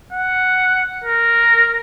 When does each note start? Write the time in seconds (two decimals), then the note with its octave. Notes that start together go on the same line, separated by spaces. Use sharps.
0.12 F#5
1.04 A#4